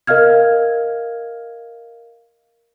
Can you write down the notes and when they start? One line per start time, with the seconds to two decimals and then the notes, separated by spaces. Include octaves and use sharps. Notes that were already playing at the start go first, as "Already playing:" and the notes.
0.07 A#4 D#5 F5 F6 G#6